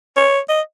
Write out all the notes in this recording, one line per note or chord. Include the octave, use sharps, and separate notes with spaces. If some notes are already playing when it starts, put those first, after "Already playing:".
C#5
D#5